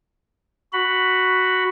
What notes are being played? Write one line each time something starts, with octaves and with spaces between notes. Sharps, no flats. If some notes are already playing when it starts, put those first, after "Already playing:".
F#4 B5